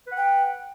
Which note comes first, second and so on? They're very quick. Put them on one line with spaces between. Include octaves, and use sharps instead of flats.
B4 F#5 G5